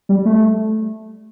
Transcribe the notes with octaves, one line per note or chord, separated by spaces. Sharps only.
G3
A3